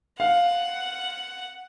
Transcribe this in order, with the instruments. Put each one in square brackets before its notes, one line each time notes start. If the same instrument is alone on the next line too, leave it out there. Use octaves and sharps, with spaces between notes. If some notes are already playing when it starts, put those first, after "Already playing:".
[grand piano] F5 [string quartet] F#5